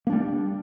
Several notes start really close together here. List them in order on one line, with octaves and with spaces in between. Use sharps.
A#3 D4 G3